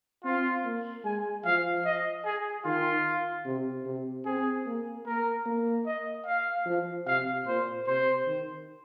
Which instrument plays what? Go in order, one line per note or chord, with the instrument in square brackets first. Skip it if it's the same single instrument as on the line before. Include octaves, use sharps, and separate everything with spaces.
[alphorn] C4 [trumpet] F4
[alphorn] A#3
[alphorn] G#3 [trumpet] G#5
[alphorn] F3 [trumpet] F5
[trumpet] D#5
G#4
[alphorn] D#3 [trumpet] F4
[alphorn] C3
C3
[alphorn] C4 [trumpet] G#4
[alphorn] A#3
[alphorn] A#3 [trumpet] A#4
[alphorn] A#3
[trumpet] D#5
F5
[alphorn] F3
[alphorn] C3 [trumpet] F5
[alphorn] A#2 [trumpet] C5
[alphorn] C3 [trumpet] C5
[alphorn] D#3